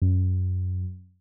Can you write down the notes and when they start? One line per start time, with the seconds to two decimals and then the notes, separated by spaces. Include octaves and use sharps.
0.02 F#2